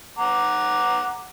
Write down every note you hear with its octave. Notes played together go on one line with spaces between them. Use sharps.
F#5 A#5 D6